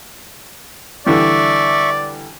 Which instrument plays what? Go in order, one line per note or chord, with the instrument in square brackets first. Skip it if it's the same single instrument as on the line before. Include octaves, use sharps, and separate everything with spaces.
[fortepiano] D3 E3 G3 [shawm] D5 [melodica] E5 C#6